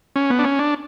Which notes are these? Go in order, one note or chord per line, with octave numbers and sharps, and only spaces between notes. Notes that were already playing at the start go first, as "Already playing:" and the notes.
C#4
B3
D4
C#4
D4